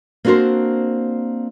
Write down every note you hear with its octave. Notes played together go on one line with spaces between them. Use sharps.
A#3 C4 D4 F#4 A#4 C5